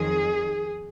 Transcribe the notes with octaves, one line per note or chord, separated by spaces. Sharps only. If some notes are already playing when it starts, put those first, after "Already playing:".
Already playing: F2 D#3 F#3 G#4